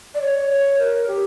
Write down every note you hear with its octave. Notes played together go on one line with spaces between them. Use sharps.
D5
C#5
C#5
A#4
G4